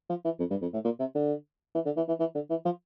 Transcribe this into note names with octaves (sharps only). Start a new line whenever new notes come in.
F3
E3
F2
G2
F2
A2
A#2
C3
D3
E3
D3
E3
E3
E3
D3
E3
F3